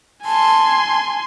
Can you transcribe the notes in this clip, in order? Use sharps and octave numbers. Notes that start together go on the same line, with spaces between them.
G#5 A5 C6